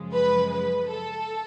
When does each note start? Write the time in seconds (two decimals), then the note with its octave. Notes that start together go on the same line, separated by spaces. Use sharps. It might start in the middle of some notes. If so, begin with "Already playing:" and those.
Already playing: F#2 C#3 F3 G#3
0.13 B4
0.51 B4
0.89 A4